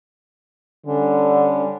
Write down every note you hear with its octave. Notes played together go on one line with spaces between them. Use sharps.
D3 G3 C#4 D4